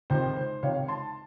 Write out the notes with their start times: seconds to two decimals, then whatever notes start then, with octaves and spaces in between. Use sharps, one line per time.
0.10 C#2 C3 D#3 C5
0.36 C5
0.63 C#2 C3 D#3 C#5 F5
0.88 A5 C6